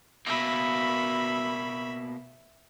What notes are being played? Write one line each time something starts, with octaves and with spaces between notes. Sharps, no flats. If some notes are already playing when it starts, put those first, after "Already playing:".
B2 A#3 E5 B5